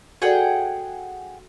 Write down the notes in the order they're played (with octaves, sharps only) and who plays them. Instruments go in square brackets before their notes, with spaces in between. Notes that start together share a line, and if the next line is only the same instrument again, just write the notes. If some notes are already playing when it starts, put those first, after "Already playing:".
[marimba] F#4 A4 D5 [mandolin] G#4 F#5 G5